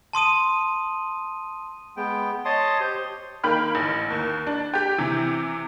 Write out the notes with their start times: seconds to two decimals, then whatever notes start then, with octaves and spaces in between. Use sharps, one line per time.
0.13 A5 C6 D#6 D#7
1.97 G#3 B3 G5
2.45 C#5 D#5 A5 C6 D#6
2.80 G4 C5 C6
3.44 D#3 A#3 G5 B5 F6
3.75 A1
4.10 D#2
4.47 D4
4.74 G4 G5
4.98 C3 E3